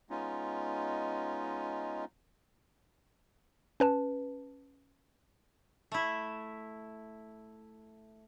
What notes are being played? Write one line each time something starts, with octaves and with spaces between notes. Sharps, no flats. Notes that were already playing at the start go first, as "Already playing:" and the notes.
G#3 B3 C#4 D#4 F4
C#4 B4 A5
A3 E4